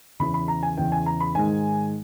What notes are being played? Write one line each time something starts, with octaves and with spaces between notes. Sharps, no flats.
E2 C#3 E3 B5
B5
A#5
G#5
E2 C#3 E3 G5
G#5
A#5
B5
G#2 D#3 G#3 G#5